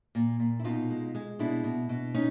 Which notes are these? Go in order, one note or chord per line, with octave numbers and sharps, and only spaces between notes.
A#2
A#2
E4
B2 D#4 F4
G#3
G#3
B2 D4 E4
B2
B2
C#4 D#4